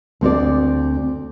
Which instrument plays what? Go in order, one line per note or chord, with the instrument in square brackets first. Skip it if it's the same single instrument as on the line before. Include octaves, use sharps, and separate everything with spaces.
[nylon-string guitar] D2 C4 F#4 D5